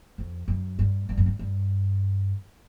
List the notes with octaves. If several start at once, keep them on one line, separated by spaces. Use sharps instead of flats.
F2
F#2
G2
G2
F#2
G2
G2